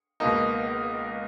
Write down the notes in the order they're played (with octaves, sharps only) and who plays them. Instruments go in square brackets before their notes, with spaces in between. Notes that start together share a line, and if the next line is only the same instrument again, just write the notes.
[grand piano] C#2 B2 A#3 D#4